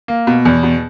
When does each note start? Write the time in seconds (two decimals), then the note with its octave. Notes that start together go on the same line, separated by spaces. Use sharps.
0.08 A#3
0.27 B2
0.45 E2
0.63 B2